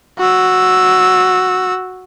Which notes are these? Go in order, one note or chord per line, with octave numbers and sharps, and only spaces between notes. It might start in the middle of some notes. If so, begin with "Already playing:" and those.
F#4 E6